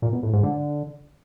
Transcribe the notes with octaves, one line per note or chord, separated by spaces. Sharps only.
A#2
B2
A2
G#2
D3